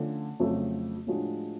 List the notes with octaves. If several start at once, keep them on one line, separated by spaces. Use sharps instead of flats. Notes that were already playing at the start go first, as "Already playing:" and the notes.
Already playing: D3 F3 A3 C#4 F4
F2 C#3 F#3 A3
A2 F3 G#3 D4 F#4